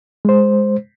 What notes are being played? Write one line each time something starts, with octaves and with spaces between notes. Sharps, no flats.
G#3 C5